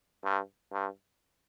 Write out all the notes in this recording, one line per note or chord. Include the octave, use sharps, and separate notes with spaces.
G2
G2